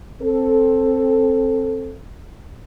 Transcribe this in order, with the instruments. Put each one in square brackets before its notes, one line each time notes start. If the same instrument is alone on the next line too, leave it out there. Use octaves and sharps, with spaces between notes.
[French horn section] C4 A4